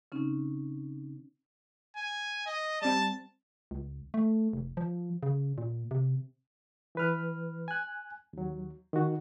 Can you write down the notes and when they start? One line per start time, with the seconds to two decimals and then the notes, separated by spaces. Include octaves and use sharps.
0.12 C#3 C4 C#4 D#4
1.96 G#5
2.46 D#5
2.82 G3 C4 A5
3.71 C#2
4.14 A3
4.53 F1
4.77 F3
5.23 C#3
5.58 A#2
5.91 C3
6.95 E3 B4 F6
7.68 G#5 F#6
8.33 D#2 F#3
8.93 D#3 F#4